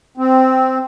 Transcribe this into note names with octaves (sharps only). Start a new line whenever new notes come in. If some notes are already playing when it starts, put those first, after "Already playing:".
C4